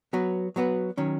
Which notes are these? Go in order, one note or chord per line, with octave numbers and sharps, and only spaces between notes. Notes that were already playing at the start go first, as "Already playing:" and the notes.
F#3 B3 F#4 B4
F#3 B3 F#4 B4
D#3 F#3 C#4